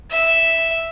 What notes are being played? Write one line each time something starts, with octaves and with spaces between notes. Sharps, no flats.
E5